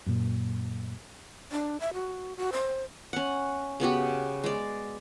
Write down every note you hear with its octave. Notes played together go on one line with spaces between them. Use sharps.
F#2 A#2
D4
E5
F#4
F#4
C5
C#4 F#5
C#3 B3 F#4 G4
G#3 D5